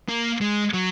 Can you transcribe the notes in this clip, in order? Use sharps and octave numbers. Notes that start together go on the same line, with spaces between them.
A#3
G#3
F#3